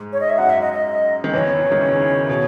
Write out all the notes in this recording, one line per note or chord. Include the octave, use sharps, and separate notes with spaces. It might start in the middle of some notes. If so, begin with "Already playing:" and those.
Already playing: G#2 G#3
C#5
D#5
E5
F#2 F#3 F#5
E5
D#5
D#5
D#3
E2 E3 C#5
D#3
C#3
B2